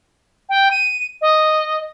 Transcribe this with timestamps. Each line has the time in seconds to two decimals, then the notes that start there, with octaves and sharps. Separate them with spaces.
0.49 G5
0.71 D#7
1.21 D#5